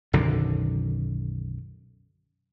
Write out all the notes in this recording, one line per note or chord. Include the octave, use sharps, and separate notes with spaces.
B1 F#2 D3 D#3